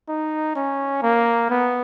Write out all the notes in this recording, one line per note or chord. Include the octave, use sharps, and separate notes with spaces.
D#4
C#4
A#3
B3